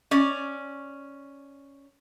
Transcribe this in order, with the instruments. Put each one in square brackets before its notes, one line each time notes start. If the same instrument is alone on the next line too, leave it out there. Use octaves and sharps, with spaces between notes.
[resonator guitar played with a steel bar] C#4 D5